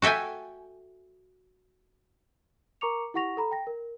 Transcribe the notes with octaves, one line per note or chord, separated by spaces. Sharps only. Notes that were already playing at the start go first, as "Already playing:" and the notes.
F#4 A4 E5 G5 G#5
A#4 A#5 C#6 D6 C#7 F7
E4 G4 F#5 C#6 A#6 F7
A4 A#5 B5
G5 A#6
A#4